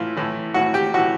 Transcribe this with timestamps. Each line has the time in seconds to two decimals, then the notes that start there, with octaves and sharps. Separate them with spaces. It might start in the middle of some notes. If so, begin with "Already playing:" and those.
Already playing: A2 E3 F4
0.16 A2 E3
0.54 A2 E3 F#4 F#5
0.74 G4 G5
0.94 A2 E3 F#4 F#5